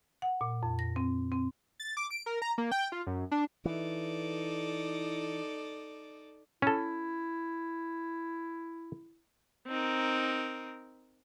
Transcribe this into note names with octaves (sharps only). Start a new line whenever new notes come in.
F#5
A#2
F2
A#6
C4
C4
A6
D6
D7
A#4
A#5
A#3
G5
F4
F#2
D4
E3 D#4 A4 D5
C#4 E4 A4
C4 D#4 A#4